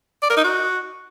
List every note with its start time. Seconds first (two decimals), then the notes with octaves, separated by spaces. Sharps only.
0.22 D5
0.30 A#4
0.37 D#4
0.44 F#4